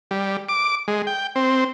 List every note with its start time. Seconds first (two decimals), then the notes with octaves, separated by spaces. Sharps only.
0.11 G3
0.49 D6
0.88 G#3
1.07 G5
1.36 C4